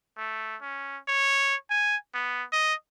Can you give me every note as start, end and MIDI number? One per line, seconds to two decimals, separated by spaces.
0.17 0.56 57
0.61 0.98 61
1.08 1.55 73
1.70 1.96 80
2.14 2.44 59
2.52 2.74 75